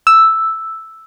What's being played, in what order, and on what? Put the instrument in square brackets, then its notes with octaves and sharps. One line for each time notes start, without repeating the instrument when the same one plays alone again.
[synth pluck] E6